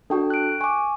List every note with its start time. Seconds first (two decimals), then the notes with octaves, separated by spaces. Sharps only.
0.10 D4 F#4 A4 G5
0.30 F#6 D7
0.61 G#5 C#6 D6